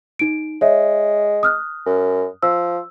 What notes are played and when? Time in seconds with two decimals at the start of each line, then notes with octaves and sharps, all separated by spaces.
0.19 D#4 D7
0.61 G#3 C#5 E5
1.43 D#6 F6 F#6
1.86 F#2
2.43 F3 E6